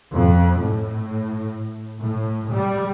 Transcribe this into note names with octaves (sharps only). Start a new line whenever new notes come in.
F2
A2
A2
G3